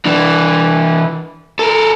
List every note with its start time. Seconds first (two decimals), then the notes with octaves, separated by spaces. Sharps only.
0.05 E3 D4
1.59 A4 A#4